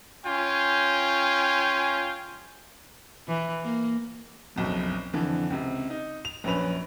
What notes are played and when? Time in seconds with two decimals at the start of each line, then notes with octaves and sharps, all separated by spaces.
0.25 C#4 F4 G5 G#5
3.27 E3
3.64 A#3
4.56 F#1 B1 F2
5.13 F2 D3 E3
5.50 C#2 C3
5.90 D#4
6.25 F7
6.44 A#1 F#2 C#4 B4 F7